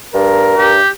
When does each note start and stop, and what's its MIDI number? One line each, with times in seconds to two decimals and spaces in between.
0.14 0.55 43
0.14 0.75 70
0.58 0.80 43
0.58 0.89 67